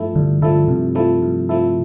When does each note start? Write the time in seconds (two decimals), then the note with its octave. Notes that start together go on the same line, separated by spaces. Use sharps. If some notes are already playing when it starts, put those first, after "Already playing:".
Already playing: G2 F3 A3 E4 A4
0.15 G2 D3
0.42 D3 F3 A3 E4 A4
0.68 G2 C3
0.95 F3 A3 E4 A4
1.22 G2
1.49 F3 A3 E4 A4